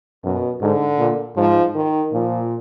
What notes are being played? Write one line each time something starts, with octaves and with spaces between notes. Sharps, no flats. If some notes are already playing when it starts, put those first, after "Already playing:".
F#2 B2
G#2 D3
A#2
G#2 F3
D#3
A#2 F3